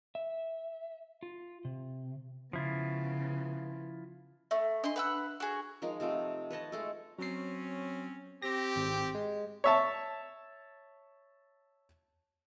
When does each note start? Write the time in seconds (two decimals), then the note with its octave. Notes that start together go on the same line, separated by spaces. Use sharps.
0.15 E5
1.23 F4
1.65 C3
2.53 C#3 F3 B3 E4 F4
4.51 A3 E5
4.84 D4 D#5 C6
4.96 B4 F#5 E6
5.40 F#4 G#4
5.82 F3 G#3 D#4 A#4
6.00 C3 F3 A3 G5
6.50 B4 C#5 D#5 A5
6.72 G#3 A3 A4
7.19 F#3 C4 C#4 C7
8.42 C4 G4 A#6
8.76 G#1
9.15 G#3
9.64 C#5 E5 A5